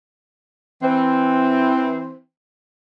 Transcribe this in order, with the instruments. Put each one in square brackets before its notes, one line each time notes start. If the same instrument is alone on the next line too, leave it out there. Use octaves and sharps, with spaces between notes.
[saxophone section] E3 C4